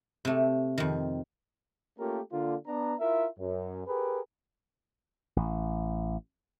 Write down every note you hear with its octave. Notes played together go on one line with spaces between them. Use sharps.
C3 A3
F2 D#3
A3 A#3 C#4 F4 G4 A#4
D3 A#3 F4
B3 D4 A#5
E4 F4 A#4 E5
F#2
G4 G#4 A#4 B4
A1